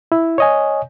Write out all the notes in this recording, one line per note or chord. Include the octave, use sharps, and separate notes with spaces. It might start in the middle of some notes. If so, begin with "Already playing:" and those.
E4
C#5 D#5 G#5